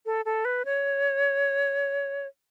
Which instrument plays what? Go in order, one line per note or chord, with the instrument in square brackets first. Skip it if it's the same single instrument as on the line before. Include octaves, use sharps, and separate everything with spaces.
[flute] A4
A4
B4
C#5